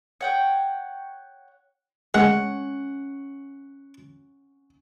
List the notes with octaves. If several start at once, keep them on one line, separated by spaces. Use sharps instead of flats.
C#5 F#5 G5
G#3 C#4 F#5